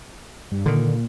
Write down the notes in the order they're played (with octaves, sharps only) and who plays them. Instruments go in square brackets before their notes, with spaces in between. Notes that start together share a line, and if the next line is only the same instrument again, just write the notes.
[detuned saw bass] G2
[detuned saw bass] A#2 [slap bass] D3 D#3